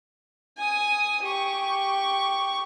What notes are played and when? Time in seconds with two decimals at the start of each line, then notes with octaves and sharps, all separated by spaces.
0.58 G#5 D#6
1.23 G4 C#6